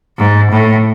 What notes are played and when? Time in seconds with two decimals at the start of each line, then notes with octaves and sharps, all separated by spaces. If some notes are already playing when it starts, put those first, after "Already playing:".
0.18 G#2
0.51 A2